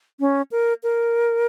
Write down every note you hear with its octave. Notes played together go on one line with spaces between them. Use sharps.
C#4
A#4
A#4